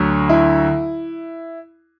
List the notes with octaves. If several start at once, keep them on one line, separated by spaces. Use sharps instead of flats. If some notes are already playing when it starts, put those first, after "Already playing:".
Already playing: D2 D3 F#3
E4